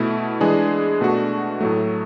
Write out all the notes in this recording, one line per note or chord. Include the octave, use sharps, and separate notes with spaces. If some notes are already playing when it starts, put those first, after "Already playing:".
Already playing: B2 A3 E4
E3 G#3 D4 G#4
B2 A3 D4 F#4
A2 F#3 A3